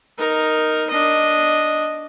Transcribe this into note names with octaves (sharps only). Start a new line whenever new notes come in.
D#4 A#4
D4 D#5